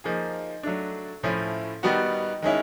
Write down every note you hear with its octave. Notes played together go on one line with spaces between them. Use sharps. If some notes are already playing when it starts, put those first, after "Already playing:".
F3 A#3 D#4 G#4
F#3 A3 D4
A2 F3 A3 C#4 E4
D#3 G3 B3 D#4 F#4
D#3 G#3 C#4 E4